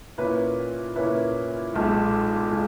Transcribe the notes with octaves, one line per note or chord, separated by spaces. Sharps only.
A#2 A#3 C#4 E4 B4
A#2 A#3 C#4 E4 B4
B1 A#2 G#3
A#2 G#3